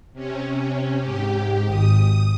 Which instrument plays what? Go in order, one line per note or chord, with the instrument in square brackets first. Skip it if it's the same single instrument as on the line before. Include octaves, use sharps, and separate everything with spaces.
[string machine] C3 C#4
G#2 G4
[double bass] G#1 [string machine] D#6